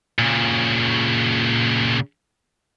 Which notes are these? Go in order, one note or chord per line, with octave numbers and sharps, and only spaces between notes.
A#2 C#3